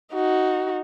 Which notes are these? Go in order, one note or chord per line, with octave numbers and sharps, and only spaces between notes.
D#4 F#4